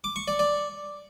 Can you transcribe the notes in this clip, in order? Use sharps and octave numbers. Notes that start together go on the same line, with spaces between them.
D6
C#6
D5
D5